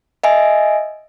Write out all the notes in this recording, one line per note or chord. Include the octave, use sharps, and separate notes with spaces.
D#5 E5 G#5